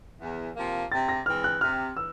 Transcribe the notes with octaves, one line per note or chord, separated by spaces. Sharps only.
E2
C3 F3 A#3
C3 A6
A#6
E3 G#3 C4 F6
F#6
C3 F6
E3 E6